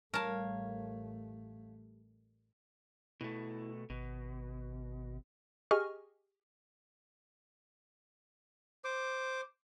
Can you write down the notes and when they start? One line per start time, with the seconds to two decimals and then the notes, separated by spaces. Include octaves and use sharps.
0.14 A1 G3 A3 A#4 C#5 F5 A5
3.21 B2 A3 E4
3.90 G#1 B2
5.71 G4 G#4 D#5 G#5 C#6 F6
8.84 C5 D6